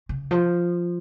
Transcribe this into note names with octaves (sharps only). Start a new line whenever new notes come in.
C#3
F3